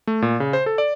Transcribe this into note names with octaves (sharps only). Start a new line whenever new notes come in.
A3
A#2
C#3
C5
A4
D5